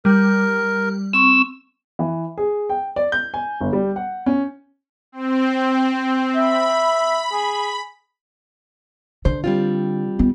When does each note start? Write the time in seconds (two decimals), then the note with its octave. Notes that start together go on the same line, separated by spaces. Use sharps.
0.05 G3 A#4
1.13 C4 C#6 E6
1.99 E3
2.38 G#4
2.70 G5
2.96 D5
3.12 G6
3.34 G#5
3.61 G1
3.73 G3
3.96 F#5
4.26 C#4
5.12 C4
6.35 E5 B5
7.32 G#4
9.25 D3 C5
9.44 G3 C4 F4
10.19 B3